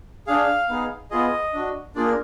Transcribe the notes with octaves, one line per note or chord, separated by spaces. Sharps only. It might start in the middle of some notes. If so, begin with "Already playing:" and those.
D4 G#4 F5
B3 D#4 G#4
B3 F4 G#4 D#5
D4 F#4
A#3 D4 F4 G#4 D5
A#4